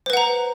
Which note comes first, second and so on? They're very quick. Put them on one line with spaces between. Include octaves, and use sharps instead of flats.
C5 B4 F#5 A#5